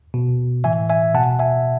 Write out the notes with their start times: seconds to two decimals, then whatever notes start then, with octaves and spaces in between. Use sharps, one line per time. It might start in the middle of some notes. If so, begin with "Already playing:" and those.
0.14 B2
0.64 A2 E3 E5 G#5
0.90 E5 G#5
1.15 B2 F#5 A5
1.40 E5 G#5